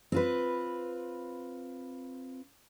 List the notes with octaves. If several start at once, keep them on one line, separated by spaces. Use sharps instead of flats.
C4 F4 B4